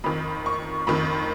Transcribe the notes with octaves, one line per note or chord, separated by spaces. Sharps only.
F2 D#3 B5
C#6
F2 D#3 B5